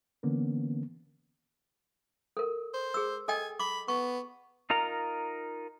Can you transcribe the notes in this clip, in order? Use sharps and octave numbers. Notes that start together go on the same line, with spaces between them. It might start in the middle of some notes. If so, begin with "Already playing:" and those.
D3 E3 A#3 B3 C#4
A4 A#4
C5
G#4 E6
A4 D#5 G5 G#5
B5 D6
B3 C#6
D#4 F4 A#4 A#5